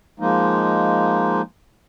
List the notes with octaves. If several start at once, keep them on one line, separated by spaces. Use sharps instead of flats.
F3 G#3 A#3 D#4